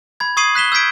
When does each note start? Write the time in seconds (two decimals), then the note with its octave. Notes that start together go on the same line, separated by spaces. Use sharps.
0.20 B5 G#6
0.37 C#6 D#6 G#6 C7 D#7 F#7
0.55 F#6 B6 E7 G7
0.72 E6 G6 G#6 B6 D7